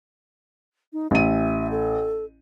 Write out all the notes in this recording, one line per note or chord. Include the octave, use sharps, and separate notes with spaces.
D#4
A1 E5 D#7
A4